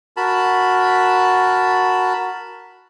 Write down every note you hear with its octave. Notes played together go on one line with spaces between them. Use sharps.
F#4 A#4 A5 B5